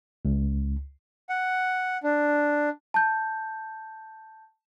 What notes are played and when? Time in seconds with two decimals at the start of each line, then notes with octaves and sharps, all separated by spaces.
0.25 C#2
1.29 F#5
2.03 D4
2.94 A5 G6